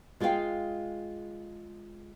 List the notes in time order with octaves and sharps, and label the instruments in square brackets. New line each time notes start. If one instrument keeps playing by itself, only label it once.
[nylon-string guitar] G#3 F4 G#4 A#4 F5 G5